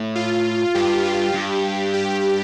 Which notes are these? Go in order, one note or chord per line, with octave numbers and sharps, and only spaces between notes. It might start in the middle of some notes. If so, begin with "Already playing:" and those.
Already playing: A2
F4
G2 G4
G4
G2
G4